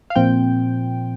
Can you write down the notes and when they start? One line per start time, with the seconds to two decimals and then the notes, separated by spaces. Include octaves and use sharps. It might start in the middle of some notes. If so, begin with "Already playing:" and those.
0.10 F5
0.16 A#2 F3 C4 G5